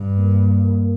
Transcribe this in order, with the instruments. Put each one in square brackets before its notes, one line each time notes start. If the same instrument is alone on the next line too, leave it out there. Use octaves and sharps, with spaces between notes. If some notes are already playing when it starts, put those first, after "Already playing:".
Already playing: [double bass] G2
[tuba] A#3